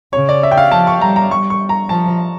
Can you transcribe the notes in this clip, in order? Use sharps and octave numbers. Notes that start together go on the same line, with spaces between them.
C#3 C#5
D5
E5
G5
F5
F3 A5
C#6
G3 A#5
A#5
G3 C#6
C#6
A#5
F3 A5